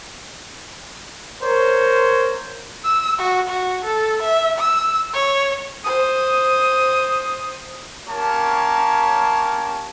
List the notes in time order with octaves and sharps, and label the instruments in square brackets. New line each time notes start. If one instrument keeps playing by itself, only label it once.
[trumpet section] A#4 C5 C#5
[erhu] E6
F#4
F#4
A4
E5
E6
C#5
[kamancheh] C5 D#6
[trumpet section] A#3 C#4 G4 A#4 C#5 A5